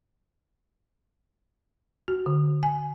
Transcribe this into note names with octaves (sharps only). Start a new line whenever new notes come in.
F#4
D3
G#5